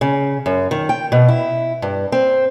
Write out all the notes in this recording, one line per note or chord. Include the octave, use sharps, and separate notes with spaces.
C#3
F#2
D#3
G5
B2
E4
G2
C4